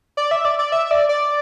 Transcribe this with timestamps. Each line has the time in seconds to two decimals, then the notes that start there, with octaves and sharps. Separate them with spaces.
0.17 D5
0.31 E5
0.45 D5
0.59 D5
0.72 E5
0.91 D5
1.09 D5